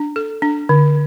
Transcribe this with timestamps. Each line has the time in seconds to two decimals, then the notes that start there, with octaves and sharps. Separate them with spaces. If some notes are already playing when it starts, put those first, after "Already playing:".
Already playing: D4
0.16 A4
0.42 D4
0.69 D3